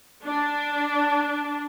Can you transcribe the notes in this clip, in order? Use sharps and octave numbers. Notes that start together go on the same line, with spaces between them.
D4